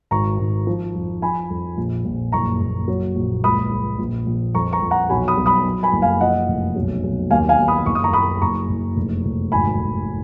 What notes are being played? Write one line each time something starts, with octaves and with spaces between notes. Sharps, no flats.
G#1 A#5 C#6
G#1
F3
F2
F3 G#5 B5
F2
A#1
A#1
F#1 A#5 C#6
F#1
F#3
A#1
C#2 B5 D#6
C#2
A#1
A#1
F2 A#5 C#6
A#5 C#6
F2
F#5 A#5
B1 G#5 B5
B5 D#6
B1
B5 D#6
F#3
G#5 B5
F#1
F5 G#5
F3 D#5 F#5
F1
B1
B1
D#2 F5 G#5
F5 G#5
D#2
B5 D#6
F#1 C#6
D#6
A#5 C#6
F#1 B5 D#6
F#1 A#5 C#6
F#1
F1
F1
G#1 G#5 B5
G#1